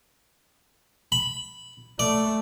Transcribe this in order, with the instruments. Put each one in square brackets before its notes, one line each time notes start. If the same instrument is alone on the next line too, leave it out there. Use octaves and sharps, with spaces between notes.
[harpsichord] B5
[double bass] A3 [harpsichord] D5